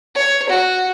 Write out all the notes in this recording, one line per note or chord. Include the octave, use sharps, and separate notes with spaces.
C#5
F#4